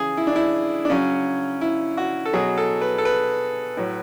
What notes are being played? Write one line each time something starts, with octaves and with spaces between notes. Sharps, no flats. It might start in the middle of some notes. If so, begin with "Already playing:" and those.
Already playing: C#3 E3 G#4
E4
D4
E4
D4
C#3 F#3 C#4
E4
F#4
A4
B2 F#3 G#4
A4
B4
A4
B4
A2 F#3